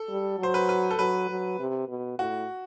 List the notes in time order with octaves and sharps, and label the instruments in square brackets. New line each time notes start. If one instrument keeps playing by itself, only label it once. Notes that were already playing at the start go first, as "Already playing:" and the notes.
Already playing: [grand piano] A4
[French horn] G3
[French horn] F#3 [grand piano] C5
[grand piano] B4
B4
A4
[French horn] F#3 [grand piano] B4
[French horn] F#3
C3
B2
[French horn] A2 [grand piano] F#4